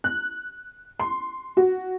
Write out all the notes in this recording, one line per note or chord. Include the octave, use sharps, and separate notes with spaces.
F#6
C6
F#4